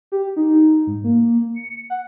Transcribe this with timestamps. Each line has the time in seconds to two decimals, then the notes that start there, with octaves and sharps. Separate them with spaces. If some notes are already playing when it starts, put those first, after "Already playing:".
0.12 G4
0.36 D#4
0.87 G#2
1.04 A#3
1.55 C#7
1.90 F#5